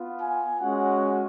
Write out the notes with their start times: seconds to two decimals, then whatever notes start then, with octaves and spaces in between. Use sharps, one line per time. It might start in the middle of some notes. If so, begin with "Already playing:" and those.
Already playing: B3 F4
0.20 G#5
0.60 G#3 C#4 F#4 F#5